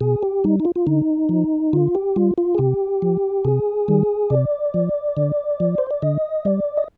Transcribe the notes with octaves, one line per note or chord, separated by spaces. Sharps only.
B2 G#4
G4
G3 D#4
D#4
F4
F4
D3 D#4
F3
D3 F4
G4
G3 F4
F4
G#4
C3 G4
F3
C3 G#4
D#3 G3
C3 D5
F3
D3
F3
C5
D5
D3 D#5
G3 D5
D#5